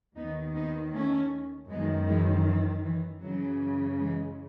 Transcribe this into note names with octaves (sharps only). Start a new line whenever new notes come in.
D#2 D#3 B3 D#4
B3 D#4
A3 C#4
F#2 D#3 G#3 B3
E3 G#3
E3
E3
F#2 C#3 E3 F#3
E3 G#3